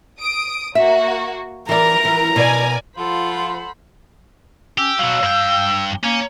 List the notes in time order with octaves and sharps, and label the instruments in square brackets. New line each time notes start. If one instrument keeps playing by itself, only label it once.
[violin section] D#6 D7
[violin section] A#3 F#4 [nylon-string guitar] E5
[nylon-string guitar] E3 D5 [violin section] A#4 [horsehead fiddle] A#5
[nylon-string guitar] E3
[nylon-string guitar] B2 [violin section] A#4 D5 G#5
[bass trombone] F3 [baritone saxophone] F4 [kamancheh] A4 F#5 [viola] C5 B5
[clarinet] C#4 [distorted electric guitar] G4 [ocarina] E6
[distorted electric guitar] B2 F#3 [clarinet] F5
[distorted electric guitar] G2 G5
[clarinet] A#3 [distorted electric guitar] C#4 [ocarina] A#5